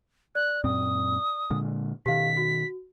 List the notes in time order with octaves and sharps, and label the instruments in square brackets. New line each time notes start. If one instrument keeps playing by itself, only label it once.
[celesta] D5 [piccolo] F#6
[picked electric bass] F#2 A#2 C4 [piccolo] D#6
[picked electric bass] A#2 D3 G#3
[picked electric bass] B2 D#3 [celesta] G4 F5 [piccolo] B6
[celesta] F#4